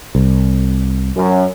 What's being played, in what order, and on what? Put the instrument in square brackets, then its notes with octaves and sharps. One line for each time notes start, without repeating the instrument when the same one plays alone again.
[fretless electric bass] C2
[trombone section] F#2